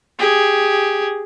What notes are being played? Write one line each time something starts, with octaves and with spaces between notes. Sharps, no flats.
G4 G#4